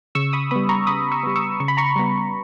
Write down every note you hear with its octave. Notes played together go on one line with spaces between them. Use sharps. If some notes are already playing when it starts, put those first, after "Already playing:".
C#3 C#6 E6
B5 D#6
G3 B3 B5 D#6
A#5 C#6
C#3 B5 D#6
C#6 E6
G3 B3
C#6 E6
C#3 C#6
B5
A#5 C#6
G3 B3